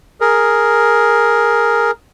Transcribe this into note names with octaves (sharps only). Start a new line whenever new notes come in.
G#4 A#4